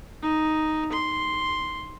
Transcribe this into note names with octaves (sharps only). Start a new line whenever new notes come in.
D#4
C6